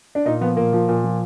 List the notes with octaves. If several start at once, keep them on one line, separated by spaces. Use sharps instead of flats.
D4
A#2 D#4
F3 B3
A#2 A#3
F3
A#2
F3